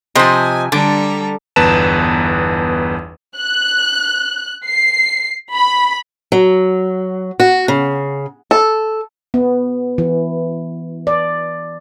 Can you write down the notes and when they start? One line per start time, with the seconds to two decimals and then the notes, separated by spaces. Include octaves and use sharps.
0.15 C3 F3 C5 D#5 G#5
0.72 D3 G3 A4 A#5 D6
1.56 G1 E2 B4 A5 A#5 E7
3.37 F#6
4.68 C7
5.55 B5
6.32 F#3
7.40 F#4
7.68 C#3
8.51 A4
9.34 B3
9.98 E3
11.07 D5